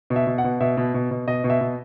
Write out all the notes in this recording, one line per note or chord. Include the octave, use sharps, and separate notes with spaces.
B2
E5
B2
F#5
B2
B2 E5
B2
B2
B2
B2 D#5
B2
E5
B2